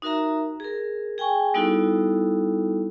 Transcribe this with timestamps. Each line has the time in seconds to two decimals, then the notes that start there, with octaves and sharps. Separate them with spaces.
0.02 D#4 F#4 A#4 E5 A#5
0.60 G#4 A#4
1.18 G#4 G5 G#5 C#6
1.54 G3 B3 D#4 E4 F#4 A4